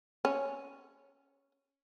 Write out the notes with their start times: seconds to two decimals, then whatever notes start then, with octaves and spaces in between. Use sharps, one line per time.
0.25 C#4